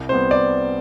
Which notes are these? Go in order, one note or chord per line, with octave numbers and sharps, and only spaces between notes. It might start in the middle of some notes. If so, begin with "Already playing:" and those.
Already playing: C2
C3 G3 B3 C5
D5